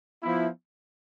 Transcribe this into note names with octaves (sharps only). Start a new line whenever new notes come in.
F3 B3 E4